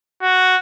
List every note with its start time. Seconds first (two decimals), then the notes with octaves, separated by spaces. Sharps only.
0.22 F#4